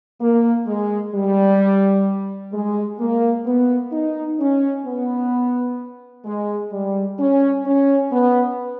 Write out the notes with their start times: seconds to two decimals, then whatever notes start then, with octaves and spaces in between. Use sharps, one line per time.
0.21 A#3
0.67 G#3
1.14 G3
2.53 G#3
2.99 A#3
3.46 B3
3.93 D#4
4.40 C#4
4.86 B3
6.25 G#3
6.72 G3
7.19 C#4
7.65 C#4
8.12 B3